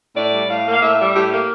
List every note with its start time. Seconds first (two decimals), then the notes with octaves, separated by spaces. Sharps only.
0.16 A2 D5
0.33 G3
0.48 A2 F5
0.65 A#3
0.72 F5
0.81 A2 E5
0.99 G3
1.14 A2 G4
1.31 A#3